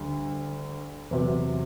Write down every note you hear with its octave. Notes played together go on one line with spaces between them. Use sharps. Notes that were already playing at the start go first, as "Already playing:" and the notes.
Already playing: D2 D3 G3
E2 C3 F#3 B4